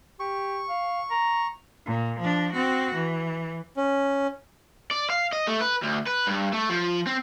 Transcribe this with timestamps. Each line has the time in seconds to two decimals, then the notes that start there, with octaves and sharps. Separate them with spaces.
0.20 G4 C#6
0.69 F5
1.11 A#5
1.86 A#2
2.19 F3 D4
2.52 C4 F#4
2.94 E3
3.77 C#4
4.91 D5
5.10 F5
5.33 D#5
5.48 A3
5.61 B4
5.82 D2
6.06 B4
6.27 G2
6.53 A3
6.70 F3
7.06 C4